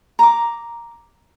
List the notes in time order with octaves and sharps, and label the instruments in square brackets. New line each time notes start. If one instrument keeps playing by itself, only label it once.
[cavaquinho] A#5 D6